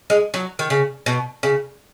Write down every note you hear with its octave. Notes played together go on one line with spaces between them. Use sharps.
G#3
F#3
D#3
C#3
B2
C#3